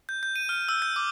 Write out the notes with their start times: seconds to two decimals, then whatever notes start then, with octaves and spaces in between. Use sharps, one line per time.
0.09 G6
0.23 G6
0.36 D#7
0.49 F6
0.69 E6
0.82 G6
0.96 D6